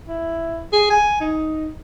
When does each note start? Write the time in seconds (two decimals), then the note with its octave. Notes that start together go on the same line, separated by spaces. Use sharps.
0.08 E4
0.73 G#4
0.90 G#5
1.20 D#4